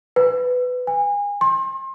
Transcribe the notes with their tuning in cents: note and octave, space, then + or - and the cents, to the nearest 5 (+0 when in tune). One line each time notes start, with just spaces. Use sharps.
B4 +15
G#5 -30
C6 +35